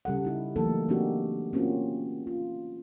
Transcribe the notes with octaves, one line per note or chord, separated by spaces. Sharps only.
C#3 G3 A4 F#5
D#4 E4 G4
E3 F#3 A3 A#3 D#4 A4
A#3 C4 D4 D#4 F#4 G4
A#3 C4 C#4 F4 F#4
F4